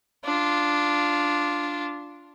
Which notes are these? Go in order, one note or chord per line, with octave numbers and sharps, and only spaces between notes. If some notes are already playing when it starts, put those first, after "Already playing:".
D4 F4